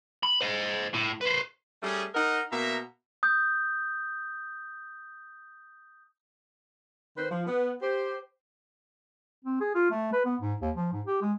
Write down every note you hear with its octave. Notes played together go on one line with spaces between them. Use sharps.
B5
C5 D#5
A2
B4 C5
G3 A3 C#4 G#4
D#4 A#4 D#5 F#5
B2 A#3 E5 A#5
D#6 G6
D#3 B4 C5
F3
B3
G4 C5
C4
G#4
F4
A3
B4
B3
G#2
D#2
F3
G#2
G4
G#3